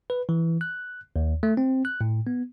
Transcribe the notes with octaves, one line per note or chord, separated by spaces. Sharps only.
B4
E3
F#6
D#2
A3
C4
F#6
A2
B3